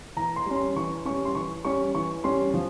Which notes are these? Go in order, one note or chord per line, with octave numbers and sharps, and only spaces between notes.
E3 A#5
C6
G3 C#4
C6
E3 C#6
G3 C#4 C#6
C6
E3 C#6
G3 C#4 C#6
E3 C#6
G3 C#4 C6
F3